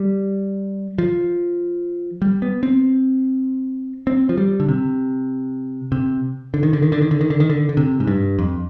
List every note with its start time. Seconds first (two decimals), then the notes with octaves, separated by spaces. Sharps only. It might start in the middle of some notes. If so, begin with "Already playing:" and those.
Already playing: G3
0.98 F3
2.22 G3
2.42 B3
2.63 C4
4.07 C4
4.29 F3
4.38 G3
4.60 D3
4.69 C3
5.92 C3
6.54 D3
6.63 D#3
6.73 D3
6.82 D#3
6.92 D3
7.02 D#3
7.11 D3
7.21 D#3
7.30 D3
7.40 D#3
7.50 D3
7.69 D3
7.77 C3
8.00 G#2
8.07 G2
8.39 F2